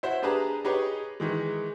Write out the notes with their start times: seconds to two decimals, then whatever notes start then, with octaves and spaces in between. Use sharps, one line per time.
0.03 E4 F#4 C5 E5
0.22 D4 G4 G#4 B4 A5 A#5
0.65 D#4 G4 G#4 B4 C#5
1.20 D#3 E3 G#3